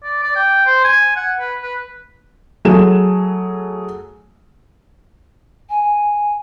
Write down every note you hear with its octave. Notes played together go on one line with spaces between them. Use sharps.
D5
D5
G5
C5
G#5
F#5
B4
B4
F#3 A3 G#4 E7
G#5